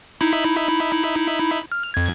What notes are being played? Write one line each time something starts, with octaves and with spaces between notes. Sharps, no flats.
D#4 E4 B5
F6
F2 G#6